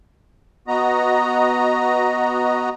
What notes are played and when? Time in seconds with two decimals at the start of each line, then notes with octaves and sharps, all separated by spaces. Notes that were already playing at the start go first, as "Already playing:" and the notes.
0.68 B3 F#4 D#5 A#5